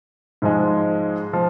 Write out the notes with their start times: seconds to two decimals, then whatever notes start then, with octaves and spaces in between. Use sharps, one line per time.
0.42 G#2 F3 G#3
1.33 F3 G#3